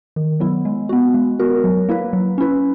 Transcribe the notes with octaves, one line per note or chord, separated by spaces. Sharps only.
D#3
F#3 B3 E4
G#3
B3 F#4
G#3
B3 F#4 A#4
F#3
A#3 E4 B4
F#3
C#4 E4 B4